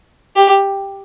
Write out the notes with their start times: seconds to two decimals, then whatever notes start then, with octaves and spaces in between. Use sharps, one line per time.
0.36 G4